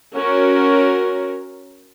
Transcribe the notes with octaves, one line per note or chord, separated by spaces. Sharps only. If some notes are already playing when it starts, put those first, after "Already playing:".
C#4 F#4 A#4